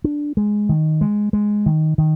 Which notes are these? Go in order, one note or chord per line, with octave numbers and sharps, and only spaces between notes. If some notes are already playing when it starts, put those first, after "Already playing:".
D4
G#3
D#3
G#3
G#3
D#3
D#3